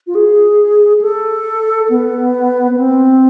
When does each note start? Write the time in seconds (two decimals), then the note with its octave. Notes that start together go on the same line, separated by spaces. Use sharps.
0.07 F4
0.15 G#4
1.01 A4
1.89 B3
2.76 C4